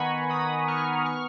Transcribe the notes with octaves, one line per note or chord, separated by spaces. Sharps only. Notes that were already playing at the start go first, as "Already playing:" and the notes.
Already playing: D#3 B3 F#5 G#5 A#5 B5 C#6
D#3 B5 D#6
B3 C#6 F6
C#6 F6